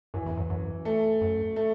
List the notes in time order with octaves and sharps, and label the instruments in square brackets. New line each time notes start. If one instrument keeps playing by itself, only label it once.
[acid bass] F#2 [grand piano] E3
[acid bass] E2
F#2
F#2
[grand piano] A3
[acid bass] F#2
[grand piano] A3